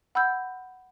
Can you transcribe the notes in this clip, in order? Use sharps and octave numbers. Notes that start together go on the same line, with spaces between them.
F#5 B5 E6 G6